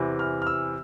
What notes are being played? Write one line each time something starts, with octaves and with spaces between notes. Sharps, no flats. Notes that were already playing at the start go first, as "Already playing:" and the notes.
Already playing: E2 C3 E3
F6
F6
E6